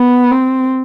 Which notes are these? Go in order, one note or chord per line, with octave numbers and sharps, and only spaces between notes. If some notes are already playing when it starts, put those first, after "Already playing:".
Already playing: B3
C4